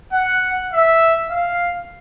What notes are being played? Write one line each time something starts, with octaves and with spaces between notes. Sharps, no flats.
F#5
E5
F5